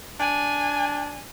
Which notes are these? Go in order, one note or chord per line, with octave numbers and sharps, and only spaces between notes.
D4 G#5